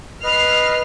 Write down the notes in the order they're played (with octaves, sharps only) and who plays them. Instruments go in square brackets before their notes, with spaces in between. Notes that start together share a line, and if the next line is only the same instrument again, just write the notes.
[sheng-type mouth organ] B4 D#5 [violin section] F6 C7